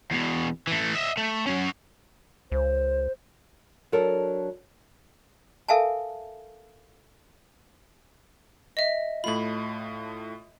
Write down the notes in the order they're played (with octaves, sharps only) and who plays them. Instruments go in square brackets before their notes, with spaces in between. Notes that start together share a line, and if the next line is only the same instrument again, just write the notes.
[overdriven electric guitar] E2 B2
E3 A3
D#5 E5
A3
F#3 C#4
[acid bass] C#2 [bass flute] C5
[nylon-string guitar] F#3 D4 A4 A#4
[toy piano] A4 A#4 E5 F5 G#5 A5
[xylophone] D#5 E5
[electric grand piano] A2 A3 F4 [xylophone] B5 F#7